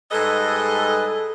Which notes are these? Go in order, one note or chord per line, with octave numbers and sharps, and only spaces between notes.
G#2 G3 G#4 A4 B4 D#5